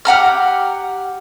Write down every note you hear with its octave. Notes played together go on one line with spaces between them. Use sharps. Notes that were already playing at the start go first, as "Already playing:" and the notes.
G4 F#5 A#5 F6